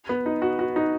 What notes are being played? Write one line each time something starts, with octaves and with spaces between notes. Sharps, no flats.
B3
D#4
F#4
F#4
D#4